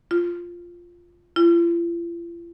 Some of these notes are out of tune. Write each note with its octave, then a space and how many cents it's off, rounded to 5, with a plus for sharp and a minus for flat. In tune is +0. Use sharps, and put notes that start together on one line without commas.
F4 -5
F4 -45